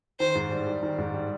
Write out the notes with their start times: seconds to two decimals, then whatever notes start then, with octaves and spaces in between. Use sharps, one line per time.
0.19 D#3 C5
0.35 G#2
0.51 G3
0.67 G3
0.83 D#3
0.98 G#2
1.14 G3